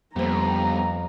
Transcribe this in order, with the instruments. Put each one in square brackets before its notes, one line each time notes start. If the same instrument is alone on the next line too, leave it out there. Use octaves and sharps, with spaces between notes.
[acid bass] F2 [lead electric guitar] G3 B3 [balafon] A#3 C5 [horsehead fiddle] A#5